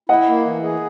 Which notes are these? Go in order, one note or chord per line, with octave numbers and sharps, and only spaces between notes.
E4 D#5 F#5
A#3
E3
G#4